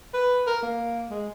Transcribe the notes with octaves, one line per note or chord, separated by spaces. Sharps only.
B4
A#4
A#3
G#3